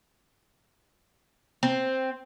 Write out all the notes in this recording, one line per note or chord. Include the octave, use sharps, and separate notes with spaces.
C4